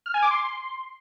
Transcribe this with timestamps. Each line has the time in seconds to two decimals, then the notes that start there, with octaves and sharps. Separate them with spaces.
0.06 F6
0.14 G#5
0.22 D6
0.31 C6